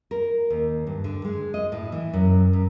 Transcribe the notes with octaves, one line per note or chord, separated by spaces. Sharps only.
A#4
D#2
G2
D3
G#3
D#5
A2
E3
F#2
F#2